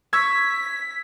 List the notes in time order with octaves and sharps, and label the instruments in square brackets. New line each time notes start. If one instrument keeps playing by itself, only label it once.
[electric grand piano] C#6 E6 G#6 [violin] B6